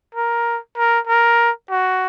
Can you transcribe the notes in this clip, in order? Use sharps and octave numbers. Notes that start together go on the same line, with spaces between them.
A#4
A#4
A#4
F#4